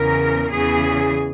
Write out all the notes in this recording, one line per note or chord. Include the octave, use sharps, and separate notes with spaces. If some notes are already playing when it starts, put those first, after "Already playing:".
Already playing: E2 C#3 E3 A#4
E2 C#3 E3 G#4